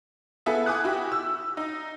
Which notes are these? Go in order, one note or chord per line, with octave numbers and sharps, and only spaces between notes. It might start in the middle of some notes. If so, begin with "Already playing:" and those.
B3 E4 G#4 A4 E5 F#5
G#5 D6 D#6 F#6
E4 F#4 G4
E6
D#4